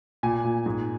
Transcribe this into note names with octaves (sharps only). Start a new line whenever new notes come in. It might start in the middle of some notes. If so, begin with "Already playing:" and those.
A#2 G#5
A#2
G#2